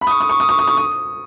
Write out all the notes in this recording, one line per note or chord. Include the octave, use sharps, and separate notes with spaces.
B5
D#6
C#6
D#6
C#6
D#6
C#6
D#6
C#6
D#6